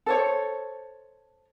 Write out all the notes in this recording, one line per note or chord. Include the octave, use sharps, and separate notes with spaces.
A4 C5 C#5